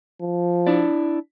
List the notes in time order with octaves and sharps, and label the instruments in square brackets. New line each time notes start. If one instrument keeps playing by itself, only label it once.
[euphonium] F3
[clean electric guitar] D4 E4 D5